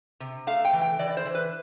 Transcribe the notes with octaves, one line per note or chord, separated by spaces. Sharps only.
C3
A3 F5
G5
E3
G5
E3 D5
D5
C5
E3
B4